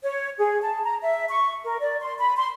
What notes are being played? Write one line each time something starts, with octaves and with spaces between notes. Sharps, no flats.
C#5
G#4
A5
A#5
E5
C#6
A#4
D5
C6
B5
C6